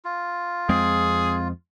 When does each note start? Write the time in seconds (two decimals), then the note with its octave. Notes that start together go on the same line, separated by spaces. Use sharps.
0.05 F4
0.69 F2 G#3 C4 G#4